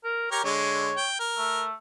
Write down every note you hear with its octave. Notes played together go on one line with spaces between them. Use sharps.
A#4
G4 A#4 C#5 A#5
D3 G#3 C#5
G5
A#4
A3